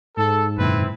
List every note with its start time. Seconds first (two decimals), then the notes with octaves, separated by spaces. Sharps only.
0.17 G#2 A4
0.58 F#2 A#2 D3 C4 E4 B4